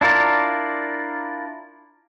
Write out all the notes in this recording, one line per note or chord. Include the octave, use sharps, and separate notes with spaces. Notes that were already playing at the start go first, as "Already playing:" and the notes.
D4 E4 F4 A#4 D5